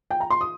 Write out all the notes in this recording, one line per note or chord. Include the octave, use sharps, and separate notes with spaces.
G5
A#5
C6
D#6